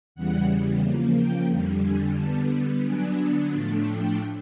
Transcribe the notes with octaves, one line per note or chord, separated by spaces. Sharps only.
E2 C#3 E3 G3 F#5
C#3 F3 A#3
G5
F2 D3 G3
G#5
D3 G3 B3 A5
D3 F#3 B3 D4 G#5
A2 F3 A3 D4
G5